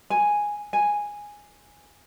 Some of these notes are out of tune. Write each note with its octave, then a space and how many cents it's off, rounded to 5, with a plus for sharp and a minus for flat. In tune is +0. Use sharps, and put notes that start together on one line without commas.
G#5 -5
G#5 -5